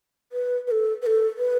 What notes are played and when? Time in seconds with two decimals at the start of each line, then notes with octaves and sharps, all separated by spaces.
0.32 B4
0.67 B4
0.71 A4
1.02 B4
1.06 A4
1.37 B4